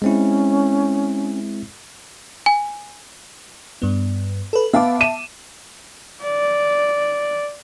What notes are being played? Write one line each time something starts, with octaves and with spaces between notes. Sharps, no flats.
G#3 C4 C#4 E4
G#5
G2 B3
A4 B4
B3 E5 F5 A5 D6
D#7 E7
D5